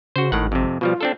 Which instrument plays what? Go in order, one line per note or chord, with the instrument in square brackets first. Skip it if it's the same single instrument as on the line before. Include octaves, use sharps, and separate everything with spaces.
[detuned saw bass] C#3 [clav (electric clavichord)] F#4 C5
[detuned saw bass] G#1 [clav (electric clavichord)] A2 D#3 F#5
[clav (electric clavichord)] F2 C3
[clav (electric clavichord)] B2 F3 G3 [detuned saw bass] F4
[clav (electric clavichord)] C4 D4 A4